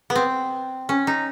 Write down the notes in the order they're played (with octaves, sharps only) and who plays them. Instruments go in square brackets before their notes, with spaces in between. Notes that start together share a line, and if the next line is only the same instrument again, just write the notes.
[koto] B3
C4
C#4
D#4